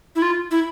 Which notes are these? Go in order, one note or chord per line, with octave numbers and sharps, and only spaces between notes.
E4
F4
E4